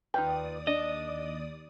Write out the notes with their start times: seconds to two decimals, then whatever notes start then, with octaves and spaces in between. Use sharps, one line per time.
0.14 D#2 D#4 F4 B4 D5 G5 D#6
0.67 D4 D#5